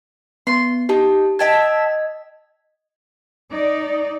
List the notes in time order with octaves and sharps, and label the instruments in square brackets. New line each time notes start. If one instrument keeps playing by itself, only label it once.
[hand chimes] B3 [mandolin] C6
[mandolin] D#4 [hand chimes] G4 A5
[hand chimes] D#5 G#6 [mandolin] E5 G5 A5
[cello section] D#4 D5